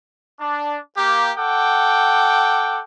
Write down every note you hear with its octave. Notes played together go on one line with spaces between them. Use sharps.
D4
A#3 G4
A4 F#5 G5 D6